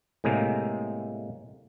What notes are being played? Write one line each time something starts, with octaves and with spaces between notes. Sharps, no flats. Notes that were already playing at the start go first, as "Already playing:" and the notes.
A2 C3 G#3 A#3